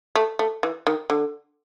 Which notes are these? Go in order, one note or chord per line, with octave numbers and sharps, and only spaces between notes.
A3
A3
E3
D#3
D3